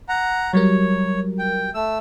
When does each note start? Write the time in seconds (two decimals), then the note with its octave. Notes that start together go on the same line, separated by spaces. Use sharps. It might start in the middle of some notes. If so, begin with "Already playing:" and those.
0.09 F#5 A#5
0.53 F#3 G3 A#4 C#5
1.39 G5
1.75 A3 E6